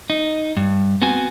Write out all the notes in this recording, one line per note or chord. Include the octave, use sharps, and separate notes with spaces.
D#4
G2
B3 C4 F#4 G#5